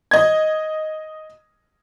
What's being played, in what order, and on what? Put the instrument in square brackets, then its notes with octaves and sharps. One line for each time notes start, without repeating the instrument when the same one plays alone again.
[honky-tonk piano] D#5 G#6